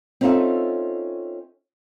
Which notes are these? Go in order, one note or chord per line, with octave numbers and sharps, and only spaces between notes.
C4 C#4 D#4 F4 A4 E5